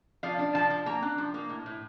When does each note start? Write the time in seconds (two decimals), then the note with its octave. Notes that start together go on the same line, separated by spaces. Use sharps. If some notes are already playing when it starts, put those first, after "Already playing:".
0.23 F3 D5 F5
0.39 D4
0.55 F3 F5 A5
0.70 F3
0.86 A#3 G5 A#5
1.02 D4
1.18 F3
1.34 A#3
1.49 A2
1.66 A2